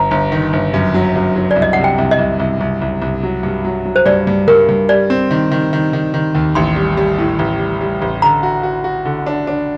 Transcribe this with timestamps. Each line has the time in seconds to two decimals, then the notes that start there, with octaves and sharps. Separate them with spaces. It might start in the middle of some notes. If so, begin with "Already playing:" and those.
Already playing: G1 A#5
0.11 G1
0.32 D#3
0.53 G1
0.74 F#2
0.94 F#3
1.15 F#2
1.36 F#3
1.51 D5
1.56 C2
1.62 D#5
1.73 C3 F#5
1.84 G5
1.98 C2
2.11 D#5
2.19 C2
2.40 C2
2.60 C2
2.82 C2
3.02 C2
3.23 F#3
3.43 G2
3.65 F#3
3.85 F#3
3.96 C5
4.06 G2 D5
4.27 G2
4.48 G2 A#4
4.69 G2
4.89 G3 D5
5.10 C4
5.31 D#3
5.51 D#3
5.73 D#3
5.93 D#3
6.14 D#3
6.35 D#2
6.55 A1 C6
6.76 G3
6.97 G3
7.18 A2
7.39 A1
7.59 G3
7.81 G3
8.02 A1
8.22 D3 A#5
8.43 F#4
8.63 F#4
8.84 F#4
9.05 D3
9.27 D4
9.47 D4